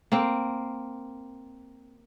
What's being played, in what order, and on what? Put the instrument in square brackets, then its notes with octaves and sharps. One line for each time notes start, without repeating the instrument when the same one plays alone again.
[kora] A#3 C4